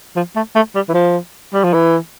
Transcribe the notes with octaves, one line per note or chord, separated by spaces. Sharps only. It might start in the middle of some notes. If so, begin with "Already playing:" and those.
F3
A3
A3
G3
E3
F3
G3
F3
E3